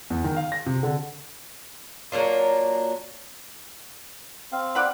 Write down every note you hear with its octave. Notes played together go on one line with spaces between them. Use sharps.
E2
D#3
F5
A#6
C3
D3
F#3 A#3 D4 F4
C4 F5
D5 F#5 B5